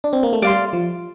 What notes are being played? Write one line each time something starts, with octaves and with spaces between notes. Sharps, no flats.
D4
C4
A#3
A3
G3 D5 F5 C6
F3